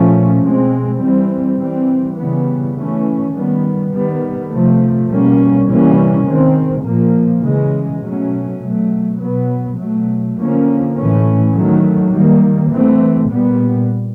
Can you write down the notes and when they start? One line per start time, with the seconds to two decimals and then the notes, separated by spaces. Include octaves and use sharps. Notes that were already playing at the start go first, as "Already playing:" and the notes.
Already playing: A#2 F3 A3 C#4
0.41 B2 G#3 C4
0.99 E3 G3 C4
1.58 E3 G3 C4
2.17 C#3 E3 G3 B3
2.75 E3 A3 C#4
3.34 D#3 G3 B3
3.93 D#3 G3 B3
4.51 C3 F3 A3
5.10 B2 G3 A#3 C#4
5.68 C3 E3 G3 A#3 C#4
6.27 D#3 G#3 C4
6.85 A#2 F3 A#3
7.44 C#3 E3 G#3
8.03 B2 F#3 A3 C#4
8.61 B2 F#3 A3
9.20 B2 F#3 B3
9.78 B2 F#3 A3
10.37 D3 F3 A#3 C#4
10.95 A2 E3 A3 C#4
11.54 D#3 F#3 A3
12.13 D#3 G3 A#3
12.71 E3 A3 C4
13.30 A#2 G3 B3